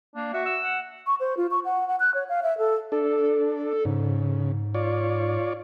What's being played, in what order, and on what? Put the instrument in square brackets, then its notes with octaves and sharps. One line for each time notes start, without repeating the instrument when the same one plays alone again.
[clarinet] A#3 [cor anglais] D4
[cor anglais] F#4 [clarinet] E5
[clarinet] E6
[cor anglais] F#5
[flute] C#6
C5
F4
C#6
F#5
F#5
F#6
C#5
F5
E5
A4
[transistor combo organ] D4 [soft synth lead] A4
[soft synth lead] G#2 [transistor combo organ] C#3
[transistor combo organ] F4 C#5 D5